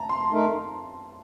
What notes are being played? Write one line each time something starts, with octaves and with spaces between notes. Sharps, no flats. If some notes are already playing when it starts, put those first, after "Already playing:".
Already playing: A5 A#5
C6
A3 D#4 A#4